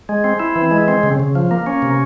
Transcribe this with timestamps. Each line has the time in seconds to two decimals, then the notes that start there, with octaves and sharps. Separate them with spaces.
0.09 G#3
0.24 C4
0.40 E4
0.56 E3
0.71 G#3
0.88 C4
1.03 C#3
1.20 C#3
1.35 F3
1.51 A#3
1.66 C#4
1.82 C3